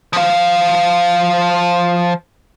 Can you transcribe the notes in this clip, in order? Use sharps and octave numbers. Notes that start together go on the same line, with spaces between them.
F3 F5